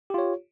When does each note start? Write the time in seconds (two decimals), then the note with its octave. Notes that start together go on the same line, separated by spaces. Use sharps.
0.10 G4
0.14 F4
0.18 C#5